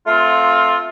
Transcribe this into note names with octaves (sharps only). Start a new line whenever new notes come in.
A3 C4 F4